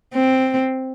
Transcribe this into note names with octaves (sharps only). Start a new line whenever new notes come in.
C4